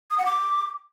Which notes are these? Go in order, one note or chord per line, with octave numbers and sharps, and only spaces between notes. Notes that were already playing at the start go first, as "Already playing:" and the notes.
D#6
F#5
D6